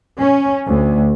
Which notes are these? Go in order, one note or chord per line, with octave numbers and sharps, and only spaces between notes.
C#4
D2